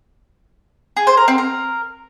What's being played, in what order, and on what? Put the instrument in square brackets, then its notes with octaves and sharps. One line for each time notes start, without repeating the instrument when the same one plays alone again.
[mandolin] G#4
C5
A#4
C4
A#4